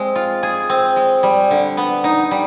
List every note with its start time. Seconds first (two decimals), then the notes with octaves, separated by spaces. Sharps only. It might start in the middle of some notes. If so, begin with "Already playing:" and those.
Already playing: G#3 C4
0.16 F4
0.43 G#4
0.70 C4
0.96 G#3
1.23 G3
1.50 D3
1.77 B3
2.04 D#4
2.31 G3